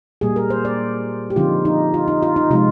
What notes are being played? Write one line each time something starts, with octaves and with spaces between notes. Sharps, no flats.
A#2 G3 A#3 G#4
A#4
C5
D5
G4
D3 F3 C4 D#4 F4
D#4
F4
D#4
F4
D#4
C3 F3 G#3 D#4 F4